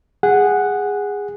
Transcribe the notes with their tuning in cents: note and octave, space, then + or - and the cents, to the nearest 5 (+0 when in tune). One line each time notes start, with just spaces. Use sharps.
G#4 -15 F#5 +0